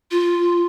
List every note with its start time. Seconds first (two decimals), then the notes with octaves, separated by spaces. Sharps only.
0.11 F4